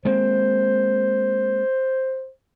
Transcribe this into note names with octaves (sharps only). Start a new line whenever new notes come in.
G#3 A#3 C4 C5